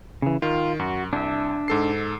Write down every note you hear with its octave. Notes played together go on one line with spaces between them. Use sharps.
C#3 E3
D#3 F4
F#2 F#4
C2 D4 E5
G#2 A4 C7